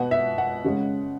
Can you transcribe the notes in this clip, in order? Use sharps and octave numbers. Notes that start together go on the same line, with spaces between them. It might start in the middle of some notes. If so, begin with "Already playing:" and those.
Already playing: B2 B3 F#5
E5
F#5
C#3 G#3 C#4